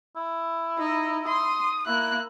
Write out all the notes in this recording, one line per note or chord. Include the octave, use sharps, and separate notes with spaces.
E4
D#4
C6 D#6
A#3 E4 F#6